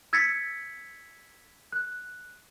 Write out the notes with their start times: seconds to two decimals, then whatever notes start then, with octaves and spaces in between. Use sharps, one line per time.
0.13 E6 G#6 A6 B6 C#7
1.72 F#6